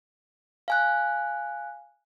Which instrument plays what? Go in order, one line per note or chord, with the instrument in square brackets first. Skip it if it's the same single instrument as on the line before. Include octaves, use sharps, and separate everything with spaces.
[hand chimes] F5 G#5 F#6